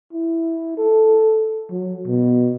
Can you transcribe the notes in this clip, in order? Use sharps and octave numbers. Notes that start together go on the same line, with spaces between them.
E4
A4
F#3
B2